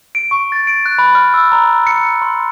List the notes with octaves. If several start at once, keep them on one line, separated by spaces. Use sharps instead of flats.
D7
C#6
A6
D7
F#6
B5
F6
E6
A#5
C#7
C6